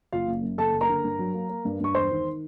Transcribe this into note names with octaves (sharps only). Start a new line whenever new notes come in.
F#1 F4 F5
F#1
F#2
F#1 A4 A5
F#1
A#4 A#5
D3
G2
F#3
A#3
A#3
G2
G2 C#6
E1 C5 C6
D#3